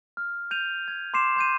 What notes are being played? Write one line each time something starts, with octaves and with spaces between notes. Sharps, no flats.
F6
G6 D#7 F7
G#6
C6 D6 C7 E7
C6 G6 D#7